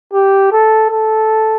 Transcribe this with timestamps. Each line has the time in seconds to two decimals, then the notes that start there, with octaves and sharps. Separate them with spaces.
0.13 G4
0.52 A4
0.91 A4